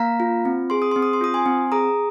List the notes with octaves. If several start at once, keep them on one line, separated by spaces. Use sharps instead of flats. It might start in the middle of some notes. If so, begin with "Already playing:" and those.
Already playing: A#3 F5 A#5
F4
C4
G#4 C6
D#6
C4 C6
D#6
C6
F4 D#6
G#5 C6
C4
G#4 A#5 D#6